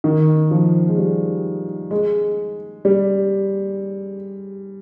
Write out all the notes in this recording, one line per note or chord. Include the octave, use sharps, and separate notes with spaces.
D#3
F3
G#3
G3
G#3
G3